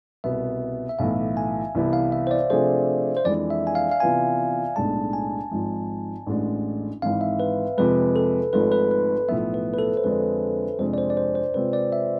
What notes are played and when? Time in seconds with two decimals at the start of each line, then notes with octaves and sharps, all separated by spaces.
0.24 C2 B2 B3 E5
0.89 E5
0.99 B1 A2 E3 F5
1.37 G#5
1.75 C2 C3 E3 B3 E4
1.93 F5
2.12 E5
2.27 C5
2.31 D5
2.50 C3 F3 A3 D4 G#4 C5
3.17 C5
3.25 F2 E3 G#3 D4 D5
3.51 E5
3.67 G#5
3.75 F5
3.91 F5
4.00 C3 E3 B3 F4 B4 G#5
4.76 B1 A2 G#3 D4 A5
5.13 G#5
5.51 G#1 G#2 F3
6.26 A1 A2 G#3 D4
7.02 G#1 G#2 E3 F5
7.21 E5
7.40 B4
7.77 F2 C3 F3 G#3 B4
8.16 A4
8.53 G#1 G#2 F3 A3 B4
8.72 B4
8.91 B4
9.28 B1 A2 F3 B3 E5
9.54 B4
9.74 B4
9.79 A4
9.97 C5
10.04 F2 D3 G#3 D4 B4
10.79 F2 C3 G#3 D4 C5
10.94 D5
10.98 C5
11.10 D5
11.17 C5
11.35 C5
11.54 C3 G#3 C4 F4 B4
11.73 D5
11.92 E5